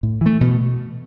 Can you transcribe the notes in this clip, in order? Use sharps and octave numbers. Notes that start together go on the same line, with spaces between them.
A2
E3 A3
B2